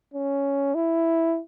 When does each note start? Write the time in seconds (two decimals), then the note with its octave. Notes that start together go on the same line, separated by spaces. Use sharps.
0.14 C#4
0.75 E4